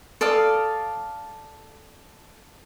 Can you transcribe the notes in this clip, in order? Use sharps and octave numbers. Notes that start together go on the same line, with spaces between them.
A4 D5 F5 D#6